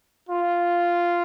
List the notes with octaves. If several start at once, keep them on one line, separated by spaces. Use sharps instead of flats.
F4